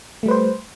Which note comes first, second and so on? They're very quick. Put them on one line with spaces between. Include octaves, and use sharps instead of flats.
A3 G3 B4 C5